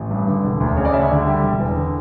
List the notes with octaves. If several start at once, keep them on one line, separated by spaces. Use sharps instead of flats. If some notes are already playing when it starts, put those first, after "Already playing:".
Already playing: A1
G2
D3
E1
D2
C#3 C#5
D5
D2 E5
D3
G3
E1
E2
D3